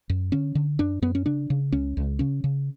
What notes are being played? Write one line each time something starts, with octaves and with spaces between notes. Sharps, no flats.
F#2
D3 C#4
D3
F#2 D4
F#2 B3
C#4
C#3 D4
C#3
C#2 C#4
C#2
C#3 C#4
C#3